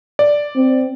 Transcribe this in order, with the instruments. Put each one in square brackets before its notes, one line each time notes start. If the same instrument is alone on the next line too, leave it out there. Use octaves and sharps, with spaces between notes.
[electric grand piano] D5
[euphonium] C4